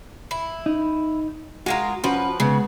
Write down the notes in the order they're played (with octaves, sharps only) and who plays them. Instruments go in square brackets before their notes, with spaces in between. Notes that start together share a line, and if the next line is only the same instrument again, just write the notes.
[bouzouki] E4
[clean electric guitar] D#4
[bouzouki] G#3 F4 A#4 [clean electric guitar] F#4
[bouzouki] F3 B4 [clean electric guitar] C#4 F#4
[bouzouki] C#3 [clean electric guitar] G#3 B3